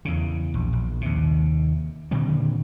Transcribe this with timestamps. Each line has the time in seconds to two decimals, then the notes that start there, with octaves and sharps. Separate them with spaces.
0.05 E2 C#3
0.54 A#1
0.73 A#1
1.01 D#2 C3
2.11 A#2 D3 D#3 C4